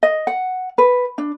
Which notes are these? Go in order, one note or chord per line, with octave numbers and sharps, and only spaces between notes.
D#5
F#5
B4
D4